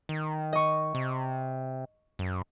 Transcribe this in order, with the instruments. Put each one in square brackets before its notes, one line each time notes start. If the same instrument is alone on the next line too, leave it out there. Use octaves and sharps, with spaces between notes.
[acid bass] D#3
[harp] D#5 C#6
[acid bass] C3
F#2